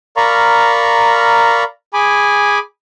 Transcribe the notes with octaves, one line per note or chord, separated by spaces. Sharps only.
A#4 D5 F5 A#5 B5 C#6
G#4 G#5 B5 D6